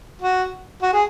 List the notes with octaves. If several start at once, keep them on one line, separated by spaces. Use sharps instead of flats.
F#4
F#4
G#4